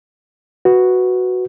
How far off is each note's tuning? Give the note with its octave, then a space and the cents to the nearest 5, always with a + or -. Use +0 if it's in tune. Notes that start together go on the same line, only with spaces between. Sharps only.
F#4 +0 B4 +0